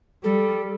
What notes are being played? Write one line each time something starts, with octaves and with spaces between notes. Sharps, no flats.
G3 A4